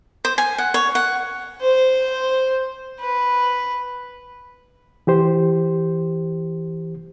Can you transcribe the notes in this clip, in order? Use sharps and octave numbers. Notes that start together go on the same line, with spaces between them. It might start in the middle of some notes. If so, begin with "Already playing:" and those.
C5
G#5
F#5
C#5
F#5
C5
B4
E3 G4 C5